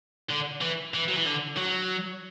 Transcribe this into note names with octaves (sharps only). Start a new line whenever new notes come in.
D3
E3
E3
F#3
E3
D3
F#3